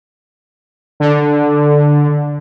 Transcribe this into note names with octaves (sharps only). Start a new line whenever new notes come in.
D3